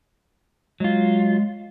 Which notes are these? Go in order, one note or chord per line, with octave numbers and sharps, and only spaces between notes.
F#3 G#3 F4